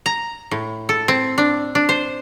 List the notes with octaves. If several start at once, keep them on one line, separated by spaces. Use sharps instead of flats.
A#5
A2
A4
C4
D4
D4
C5